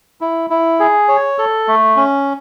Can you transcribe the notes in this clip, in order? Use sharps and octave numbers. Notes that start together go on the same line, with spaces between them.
E4
E4
G#4
C#5
A4
A3
C#4